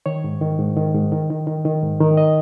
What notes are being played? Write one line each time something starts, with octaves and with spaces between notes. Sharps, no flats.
D#3 C#5
G#2
D#3
G#2
D#3
G#2
D#3
D#3
D#3
D#3
G#2
D#3
D#5